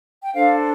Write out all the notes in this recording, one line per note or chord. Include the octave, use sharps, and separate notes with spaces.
G5
D4 A4 C5 F5